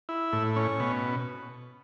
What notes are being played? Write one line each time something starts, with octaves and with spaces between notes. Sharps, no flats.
E4
A2
C#4
B2